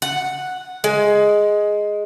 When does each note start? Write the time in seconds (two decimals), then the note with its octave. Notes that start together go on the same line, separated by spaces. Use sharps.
0.02 F#5
0.84 G#3